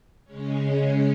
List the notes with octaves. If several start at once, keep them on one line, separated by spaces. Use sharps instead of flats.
C#3 G#3 C#4